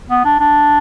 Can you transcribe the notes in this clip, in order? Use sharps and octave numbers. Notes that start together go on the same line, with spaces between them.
B3
D4
D4